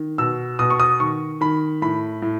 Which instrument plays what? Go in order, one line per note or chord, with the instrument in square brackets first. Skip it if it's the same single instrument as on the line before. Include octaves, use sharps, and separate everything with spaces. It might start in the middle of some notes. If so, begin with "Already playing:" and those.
Already playing: [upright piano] D#3
B2 E6
B2 D#6
C#6
D#6
D#3 C#6
D#3 B5
A2 B5
A2